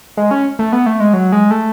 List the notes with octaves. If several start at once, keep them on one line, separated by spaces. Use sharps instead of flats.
G#3
C#4
A3
B3
A3
G#3
F#3
G#3
A3